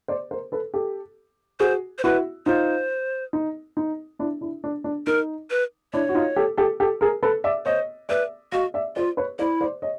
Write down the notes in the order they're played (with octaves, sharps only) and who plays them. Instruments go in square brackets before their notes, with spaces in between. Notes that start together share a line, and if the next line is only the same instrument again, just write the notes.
[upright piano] C5 D5
A#4 C5
A4 B4
G4 A4
[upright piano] F#4 G#4 [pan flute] C5
[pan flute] C5
[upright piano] E4 F#4 [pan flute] B4
[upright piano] D#4 F4 [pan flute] C5
[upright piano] D#4
D#4
D4 E4
D4 E4
D4
D4
[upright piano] D#4 [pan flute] A#4
[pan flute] B4
[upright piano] D4 E4 [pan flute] C#5
[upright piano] F#4
D#4 F4
G4 A4
G4 A4
G4 A4
G#4 A#4
A4 B4
D5 E5
[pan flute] C5 [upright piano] C#5 D#5
[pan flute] B4 [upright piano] D5 E5
[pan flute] F#4 [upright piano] D#5 F5
[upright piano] D5 E5
[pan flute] F4 [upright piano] C5 D5
[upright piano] B4 C#5
[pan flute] E4 [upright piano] C5 D5
[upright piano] C5 D5
C#5 D#5